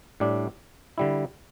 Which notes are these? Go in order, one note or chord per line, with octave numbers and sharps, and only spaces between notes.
A2 G3 D4
D3 G3 E4